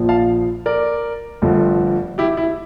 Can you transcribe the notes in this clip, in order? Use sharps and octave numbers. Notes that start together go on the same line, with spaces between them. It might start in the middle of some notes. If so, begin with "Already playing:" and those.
Already playing: A#1 A#2 F3
F5 A5
A#4 D5
G1 G2 D3 F3 A3
E4 G4
E4